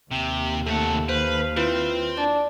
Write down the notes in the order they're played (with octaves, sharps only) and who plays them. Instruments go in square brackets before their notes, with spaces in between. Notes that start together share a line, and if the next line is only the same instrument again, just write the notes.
[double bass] D#2 [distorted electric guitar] C3
[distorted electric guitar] C3 F#5 [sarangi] A3 [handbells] A4 A5
[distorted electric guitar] B4 [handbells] C5 [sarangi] F5
[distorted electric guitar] C4 [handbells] E4 F4 B4
[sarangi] D4 [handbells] D5